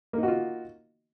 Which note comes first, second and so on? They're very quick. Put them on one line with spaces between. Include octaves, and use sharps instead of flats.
A#3 D#4 F#4 F4